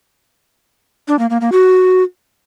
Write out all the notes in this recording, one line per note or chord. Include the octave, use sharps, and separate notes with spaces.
D4
A#3
A#3
A#3
F#4